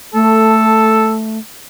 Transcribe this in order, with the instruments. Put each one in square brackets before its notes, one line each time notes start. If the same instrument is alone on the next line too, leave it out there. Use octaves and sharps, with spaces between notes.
[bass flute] A3 [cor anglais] A4